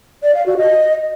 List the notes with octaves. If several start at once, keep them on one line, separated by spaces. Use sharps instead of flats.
D5
F5
F#4
D#5